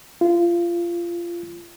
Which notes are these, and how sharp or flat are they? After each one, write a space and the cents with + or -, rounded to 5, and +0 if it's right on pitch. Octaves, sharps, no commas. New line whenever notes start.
F4 -25